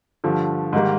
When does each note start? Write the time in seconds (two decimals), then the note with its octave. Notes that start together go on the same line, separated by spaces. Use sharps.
0.24 G2 D3 F3
0.73 G#2 D#3 G3 A#3